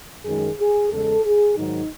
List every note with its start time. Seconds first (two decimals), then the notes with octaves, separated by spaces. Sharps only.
0.25 F#2 D#3 G#3 G#4
0.59 G#4
0.91 E2 C#3 G#3 A4
1.24 G#4
1.57 G#2 D#3 F#3 D#4